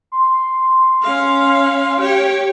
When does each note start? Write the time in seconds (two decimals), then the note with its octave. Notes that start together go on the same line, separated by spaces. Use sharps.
0.12 C6
1.02 C#4 F5
2.01 G4 C#5